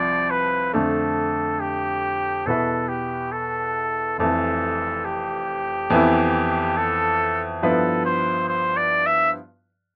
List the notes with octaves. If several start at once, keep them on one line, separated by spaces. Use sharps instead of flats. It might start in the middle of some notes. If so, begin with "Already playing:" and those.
Already playing: C2 F3 C4 D5
B4
F2 D3 A3 A4
G4
E2 B2 B3 E4 A4 B4
G4
A4
F1 F2 E3 A4
G4
F2 E3 B3 E4
A4
G2 F3 B3 E4 A4 B4
C5
C5
D5
E5